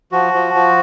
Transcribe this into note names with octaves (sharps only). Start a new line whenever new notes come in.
F3 F#4
F3
F3